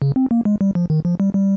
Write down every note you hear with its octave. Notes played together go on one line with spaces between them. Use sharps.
C#3
C4
A#3
G#3
G3
F3
D#3
F3
G3
G3